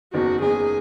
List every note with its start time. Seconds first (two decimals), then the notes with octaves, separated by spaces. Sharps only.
0.13 F#1 E2 D#3 F#4
0.41 F#1 E2 D#3 G#4